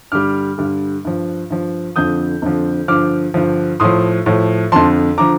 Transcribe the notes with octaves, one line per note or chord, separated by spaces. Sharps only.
G2 D3 G3 D6 F6
G2 D3 G3
G2 F3
G2 F3
F2 D3 F3 D#6 G6
F2 D3 F3
G2 D3 F3 D6 F6
G2 D3 F3
A2 F3 C6 D#6
A2 F3
F2 D3 F3 A5 C6
D3 F3 A#5 D6